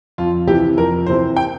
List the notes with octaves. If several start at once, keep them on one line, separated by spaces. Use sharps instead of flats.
F2 F4
C3 E3 G4
F2 A#4
C3 E3 C5
G5